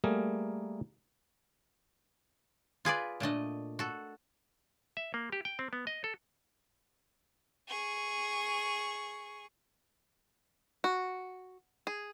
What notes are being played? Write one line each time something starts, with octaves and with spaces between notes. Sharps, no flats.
G3 A3 A#3 G#4 A#4
F4 G#4 B4 D5
A#2 A3 D4 D#5
F#4 A4
E5
A#3
G4
G5
C4
B3
D#5
A4
G#4 C#6
F#4
G#4